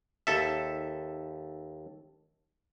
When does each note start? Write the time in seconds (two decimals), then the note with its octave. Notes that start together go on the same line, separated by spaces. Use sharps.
0.27 D#2 A4 E5